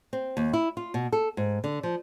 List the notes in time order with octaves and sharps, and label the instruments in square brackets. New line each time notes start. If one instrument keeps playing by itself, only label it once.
[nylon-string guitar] C4
D#2
E4
F4
B2
A4
G#2
D3
F3